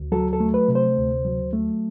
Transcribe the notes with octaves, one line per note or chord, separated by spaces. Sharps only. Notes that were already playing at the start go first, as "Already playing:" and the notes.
Already playing: D2
F#3 A4
A4
A3
B4
C3
C5
D2
F#3
A3